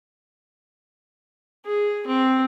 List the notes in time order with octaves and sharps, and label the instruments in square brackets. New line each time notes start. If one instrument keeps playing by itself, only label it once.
[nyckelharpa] G#4
C4